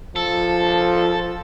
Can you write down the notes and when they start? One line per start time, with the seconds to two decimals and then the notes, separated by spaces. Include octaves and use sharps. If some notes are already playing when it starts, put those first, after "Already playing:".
0.16 F3 A4